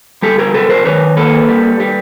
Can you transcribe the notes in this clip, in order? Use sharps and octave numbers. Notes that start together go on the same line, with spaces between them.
G3 G4 A4
G#4 A#4
C3 A4 B4
A#4 C5
D#3 B4 C#5
A#3 A4 B4
G3
G3